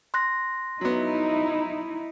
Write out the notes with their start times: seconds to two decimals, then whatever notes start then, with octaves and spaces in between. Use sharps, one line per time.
0.14 C6 F#6 A#6
0.81 F#3 B3 D#4 E4